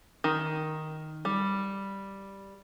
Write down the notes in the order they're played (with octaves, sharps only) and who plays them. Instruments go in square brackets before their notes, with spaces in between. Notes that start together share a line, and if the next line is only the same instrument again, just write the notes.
[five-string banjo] D#3
G3